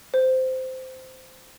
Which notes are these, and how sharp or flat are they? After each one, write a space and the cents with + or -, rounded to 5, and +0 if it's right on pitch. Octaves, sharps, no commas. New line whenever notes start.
C5 -15